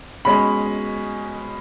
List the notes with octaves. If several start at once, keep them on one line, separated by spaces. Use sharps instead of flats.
B2 G#3 C#4 B5